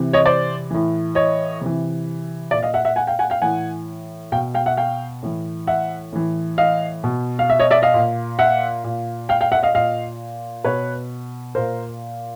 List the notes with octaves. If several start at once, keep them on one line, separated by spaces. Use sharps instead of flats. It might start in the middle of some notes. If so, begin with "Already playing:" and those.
Already playing: C3 E3
C#5 D#5
C5 D5
A2 E3
C#5 D#5
C3 E3
A#2 D5 E5
D#5 F5
E5 F#5
E5 F#5
F#5 G#5
F5 G5
F#5 G#5
F5 G5
A2 E3 F#5 G#5
B2 F5 G5
F5 G5
E5 F#5
F5 G5
A2 E3
E5 F#5
A2 E3
D#5 F5
B2
F5
E5
C#5 D#5
D5 E5
D#5 F5
A#2
E5 F#5
A#2
F5 G5
F5 G5
E5 F#5
D#5 F5
A#2 D#5 F5
B2 B4 C#5
A#2 A#4 C5